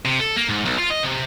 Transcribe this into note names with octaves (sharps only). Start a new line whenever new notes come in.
C3
A4
A#3
G#2
B1
F4
D#5
C3